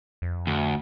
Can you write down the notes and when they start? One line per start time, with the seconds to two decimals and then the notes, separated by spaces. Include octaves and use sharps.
0.22 F2
0.47 D2